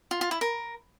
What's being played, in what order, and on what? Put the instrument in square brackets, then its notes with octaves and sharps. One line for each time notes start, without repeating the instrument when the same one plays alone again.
[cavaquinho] F4
F4
E4
A#4